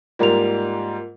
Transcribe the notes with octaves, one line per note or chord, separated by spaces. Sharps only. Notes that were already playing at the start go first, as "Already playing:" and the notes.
G#2 G3 A#3 F4 A#4 F7